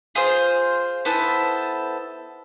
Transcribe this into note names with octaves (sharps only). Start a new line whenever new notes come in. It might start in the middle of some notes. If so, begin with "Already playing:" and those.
F4 G#4 C5
B3 E4 A4 C5